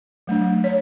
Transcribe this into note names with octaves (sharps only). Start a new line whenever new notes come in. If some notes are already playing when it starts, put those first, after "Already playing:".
F#3 A3 D4
C#5